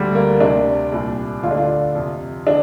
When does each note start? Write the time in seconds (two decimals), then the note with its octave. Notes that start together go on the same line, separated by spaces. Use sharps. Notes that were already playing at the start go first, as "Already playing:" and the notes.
Already playing: D2 D3 G3
0.15 A#3
0.40 D2 C3 D4
0.92 C2 A#2
1.43 D2 D3 F4
1.51 D4
1.57 F4
1.95 F2 C3
2.47 D3 D4